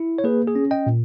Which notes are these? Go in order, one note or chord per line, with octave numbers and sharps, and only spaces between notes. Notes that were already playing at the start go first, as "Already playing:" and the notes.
Already playing: E4
C#5
A#3 G#4 B4
G#4
C#4
D#5 G5
A#2